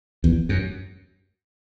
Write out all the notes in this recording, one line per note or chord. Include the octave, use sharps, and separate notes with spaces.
E2
F#2